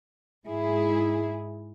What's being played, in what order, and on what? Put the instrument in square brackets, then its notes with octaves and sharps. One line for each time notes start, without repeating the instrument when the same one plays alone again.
[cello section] G#2 E4 G#4